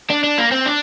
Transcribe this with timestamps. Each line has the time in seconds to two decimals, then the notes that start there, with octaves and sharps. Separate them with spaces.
0.10 D4
0.24 D4
0.38 A#3
0.52 C4
0.66 D4